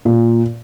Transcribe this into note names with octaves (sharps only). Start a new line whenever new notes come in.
A#2